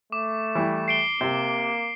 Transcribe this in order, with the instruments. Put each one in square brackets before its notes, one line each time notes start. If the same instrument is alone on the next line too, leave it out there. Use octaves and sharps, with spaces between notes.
[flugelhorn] A3 [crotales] D6
[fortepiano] E3 G3
[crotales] C7 D7 G7
[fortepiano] C3 [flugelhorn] A#3